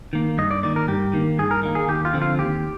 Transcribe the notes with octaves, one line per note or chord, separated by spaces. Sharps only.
D#3 A#3
G2 D#5
D5
D#3 A#3 D5
A#4
G2 G4
D#3 A#3
G2 G#4
A#4
D#3 A#3
G#4
D#2 G4
F4
D3 F3 C4
F4
D#2 G4